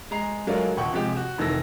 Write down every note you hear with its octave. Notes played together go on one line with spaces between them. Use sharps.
G#3 A#5 C7
F#3 G#3 A3 D4 F4 A#4
D#1 A#1 F#5 G5 C#6
C3 F3 G#3 G4
F#4
F1 D#3 E3 A3 E6 A#6